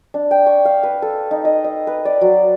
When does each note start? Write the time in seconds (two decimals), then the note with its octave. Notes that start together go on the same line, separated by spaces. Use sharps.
0.14 D4
0.31 G5
0.46 C#6
0.65 F5
0.83 B4
1.02 A4
1.31 D#4
1.45 D#5
1.64 D#5
1.87 B4
2.05 D5
2.21 F#3